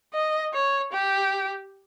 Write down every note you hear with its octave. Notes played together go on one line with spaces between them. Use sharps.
D#5
C#5
G4